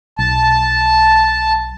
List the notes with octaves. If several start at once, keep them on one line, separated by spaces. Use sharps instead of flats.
B1 A5